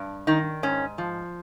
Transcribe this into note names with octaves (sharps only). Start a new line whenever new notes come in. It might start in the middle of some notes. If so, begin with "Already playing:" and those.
Already playing: G2
D#3 D#4
G#2 C#4
F3